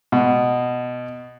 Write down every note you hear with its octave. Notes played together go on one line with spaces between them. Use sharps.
B2